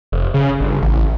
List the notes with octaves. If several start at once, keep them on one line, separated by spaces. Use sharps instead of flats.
F1
C#3
G1
A1